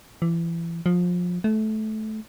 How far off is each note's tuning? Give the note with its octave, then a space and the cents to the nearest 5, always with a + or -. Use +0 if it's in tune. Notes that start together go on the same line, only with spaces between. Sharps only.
E3 +30
F3 +25
A3 -20